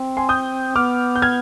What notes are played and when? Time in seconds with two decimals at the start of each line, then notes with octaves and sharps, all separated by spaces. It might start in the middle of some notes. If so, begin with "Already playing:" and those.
Already playing: C4
0.17 G#5 C6
0.29 D#6 G6
0.76 B3 D6 F6
1.16 G6
1.22 F6 G#6